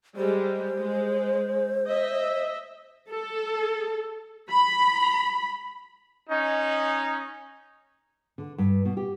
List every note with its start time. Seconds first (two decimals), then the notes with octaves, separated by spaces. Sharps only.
0.17 G3 G#3 C5
0.78 G#3
1.86 D#5 E5
3.09 A4
4.50 B5
6.30 C#4 D#4
8.38 D3
8.58 G2
8.85 B2
8.97 G4